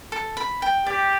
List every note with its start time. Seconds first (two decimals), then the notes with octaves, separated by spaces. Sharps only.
0.12 A4
0.37 B5
0.62 G5
0.86 G4 D5